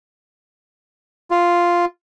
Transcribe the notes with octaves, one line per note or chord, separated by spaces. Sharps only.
F4